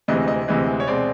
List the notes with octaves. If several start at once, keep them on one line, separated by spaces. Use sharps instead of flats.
D2 C3 E3 G#3 D#5
D#5
D2 C3 E3 G#3
C#5
B2 G#3 C4 D5